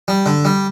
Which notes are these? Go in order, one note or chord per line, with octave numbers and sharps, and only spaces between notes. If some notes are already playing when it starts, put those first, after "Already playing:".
G3
D3
G3